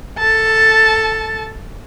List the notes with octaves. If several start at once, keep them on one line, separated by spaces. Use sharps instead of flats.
A4 A5